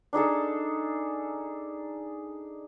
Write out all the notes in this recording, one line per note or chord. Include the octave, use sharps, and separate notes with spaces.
D4 D#4 G#4 A4